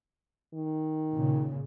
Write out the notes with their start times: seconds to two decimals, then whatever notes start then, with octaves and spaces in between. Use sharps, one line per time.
0.54 D#3
1.12 A#2 C#3